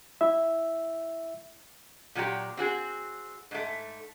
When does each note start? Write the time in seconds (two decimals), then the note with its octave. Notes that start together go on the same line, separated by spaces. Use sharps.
0.21 E4 E5
2.15 A#2 F#3 F#4 G4
2.57 C4 F#4 G#4
3.51 G#2 A3